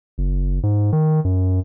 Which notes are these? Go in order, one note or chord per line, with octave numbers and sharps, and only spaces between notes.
F#1
G#2
D#3
F#2